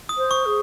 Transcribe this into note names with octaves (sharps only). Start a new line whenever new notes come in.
D#6
C5
C#6
G#4